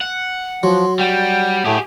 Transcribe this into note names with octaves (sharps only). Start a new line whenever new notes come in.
F#5
F3 F#3 C6
G3 F#5 G5
A2 A3 G4 G#4